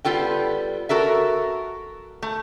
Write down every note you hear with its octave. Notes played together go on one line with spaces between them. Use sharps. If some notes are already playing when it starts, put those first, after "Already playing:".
G3 B3 F4 A4 G5
F#4 A4 A#4 E5
A3